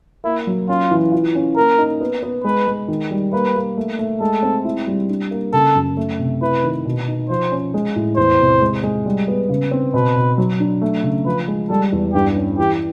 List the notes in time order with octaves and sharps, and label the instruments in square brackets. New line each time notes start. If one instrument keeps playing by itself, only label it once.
[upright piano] A#3 [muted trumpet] E4
[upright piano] F#3
[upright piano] C#4 [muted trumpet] F4
[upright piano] E3
F4
C#4
[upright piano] A#3 [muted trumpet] A#4
[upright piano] D#4
B3
B3
[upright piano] G#3 [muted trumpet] B4
[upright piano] G#3
D#3
G3
[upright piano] A#3 [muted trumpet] B4
[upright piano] A#3
A3
A3
[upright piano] G#3 [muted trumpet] A4
[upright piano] C4
E4
G3
D4
A#3
[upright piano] C#3 [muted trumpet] A4
[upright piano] F#2
A3
C3
[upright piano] E4 [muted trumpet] B4
[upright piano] D#3
B2
D#4
[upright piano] F3 [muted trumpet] C5
[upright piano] C#4
G#3
A2
[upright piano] E2 [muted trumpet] C5
[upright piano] C3
G#3
G#3
G3
B3
C#3
C4
[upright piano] B2 [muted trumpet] B4
[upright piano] B2
F#3
D4
A3
C#3
[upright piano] F3 [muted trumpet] B4
[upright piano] G#3
[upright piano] G3 [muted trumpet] A4
[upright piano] E2
[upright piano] G2 [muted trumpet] G4
[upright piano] C#4
[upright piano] E3 [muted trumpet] G4